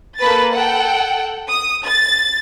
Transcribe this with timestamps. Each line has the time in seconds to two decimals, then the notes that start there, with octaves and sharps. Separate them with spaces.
0.19 A#3 A4 B4 A6
0.55 A4 F#5 G5
1.48 D#6
1.85 A6